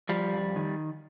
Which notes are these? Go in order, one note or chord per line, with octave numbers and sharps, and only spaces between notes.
F3 G3
F2
D#3